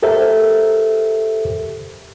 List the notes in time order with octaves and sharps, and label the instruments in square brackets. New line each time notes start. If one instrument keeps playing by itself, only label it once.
[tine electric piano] G4 A4 A#4 C5 E5